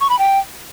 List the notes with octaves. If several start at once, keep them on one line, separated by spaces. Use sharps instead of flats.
C#6
B5
G5